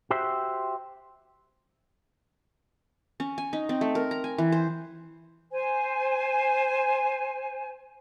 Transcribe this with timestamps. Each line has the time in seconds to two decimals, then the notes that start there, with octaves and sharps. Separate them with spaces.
0.10 F#4 G4 C5 E5
3.20 C#4
3.38 G#5
3.53 D#4
3.69 C4
3.81 A3
3.95 A#4
4.11 A#5
4.24 G#5
4.38 E3
4.52 C5
5.51 C5 G#5